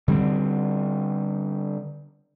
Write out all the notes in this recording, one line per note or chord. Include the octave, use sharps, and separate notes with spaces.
D3 G3 A#3 C4